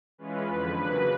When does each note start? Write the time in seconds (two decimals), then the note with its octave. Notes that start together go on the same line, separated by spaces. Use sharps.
0.18 E3 G#3 C#4 F4 B4
0.48 F2 D3 F3
0.77 C#3 F#3 A#3 B4